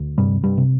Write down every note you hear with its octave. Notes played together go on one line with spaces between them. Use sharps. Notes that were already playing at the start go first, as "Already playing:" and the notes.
Already playing: D2
G2 C3 G3
G2 G3
C3